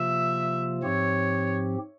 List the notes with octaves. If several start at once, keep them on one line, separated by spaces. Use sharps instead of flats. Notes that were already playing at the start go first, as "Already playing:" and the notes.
Already playing: C3 F3 A#3 F4 E5
G#2 F3 C4 G4 C#5